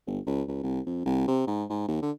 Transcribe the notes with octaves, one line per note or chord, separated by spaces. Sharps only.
G1
C#2
C#2
C2
F2
C2
C3
G#2
G#2
D#2
D3